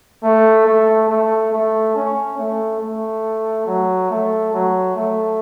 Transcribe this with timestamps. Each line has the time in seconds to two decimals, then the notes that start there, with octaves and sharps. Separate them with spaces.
0.23 A3
0.66 A3
1.09 A3
1.53 A3
1.95 C#4
2.38 A3
2.81 A3
3.67 F#3
4.10 A3
4.53 F#3
4.96 A3